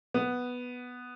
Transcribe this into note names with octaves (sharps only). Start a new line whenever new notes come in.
B3